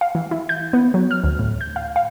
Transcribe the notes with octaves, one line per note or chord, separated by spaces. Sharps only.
F5
E3
E4
G6
B3
F#3
F6
D2
A2
G6
F5
F5